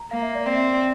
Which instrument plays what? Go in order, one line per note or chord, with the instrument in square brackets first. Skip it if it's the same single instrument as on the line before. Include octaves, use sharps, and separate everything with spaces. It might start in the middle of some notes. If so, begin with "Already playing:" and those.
Already playing: [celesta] A#5
[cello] A#3 [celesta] F5
[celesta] E5
D5
[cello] C4 [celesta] D5
[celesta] E5
D5